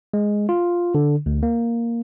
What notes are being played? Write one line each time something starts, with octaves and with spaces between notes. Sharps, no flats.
G#3
F4
D3
D2
A#3